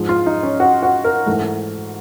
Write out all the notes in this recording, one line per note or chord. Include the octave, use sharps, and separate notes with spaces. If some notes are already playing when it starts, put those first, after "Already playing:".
Already playing: G#2 F3 G#3
F4
D#4
C#4
F#4
F#4
A#4
G#2 E3 A3